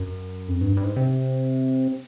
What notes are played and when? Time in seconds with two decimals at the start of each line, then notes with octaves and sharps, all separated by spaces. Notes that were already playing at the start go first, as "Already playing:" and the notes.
Already playing: F#2
0.48 F2
0.61 G2
0.77 G2
0.84 G#2
0.96 C3